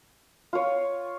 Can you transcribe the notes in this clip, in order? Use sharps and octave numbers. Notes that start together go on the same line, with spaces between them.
F4 C#5